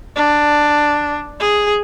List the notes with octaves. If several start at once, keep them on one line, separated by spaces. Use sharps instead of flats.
D4
G#4